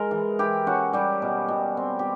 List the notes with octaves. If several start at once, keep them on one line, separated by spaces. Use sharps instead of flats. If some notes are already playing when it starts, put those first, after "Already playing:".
Already playing: G#3 A#4
E3
E4 G4
C#4 F#4
G3 G4
B2
B2
C4
G4